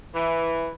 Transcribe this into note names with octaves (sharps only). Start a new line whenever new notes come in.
E3